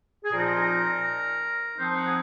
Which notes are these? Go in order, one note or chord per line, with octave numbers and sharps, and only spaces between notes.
G#4
A#2 F3 C4 D#4 A#4
F3 C4 D#4 C5
F#5
G#4